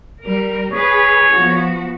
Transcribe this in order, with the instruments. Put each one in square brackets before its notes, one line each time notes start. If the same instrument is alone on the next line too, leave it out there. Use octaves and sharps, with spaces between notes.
[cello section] G3 A#4
[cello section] G#4 B4 [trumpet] C#5
[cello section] F3 B3 F#4